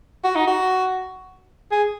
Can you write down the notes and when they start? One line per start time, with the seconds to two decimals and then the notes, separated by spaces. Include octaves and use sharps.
0.24 F#4
0.36 D#4
0.47 F#4
1.71 G#4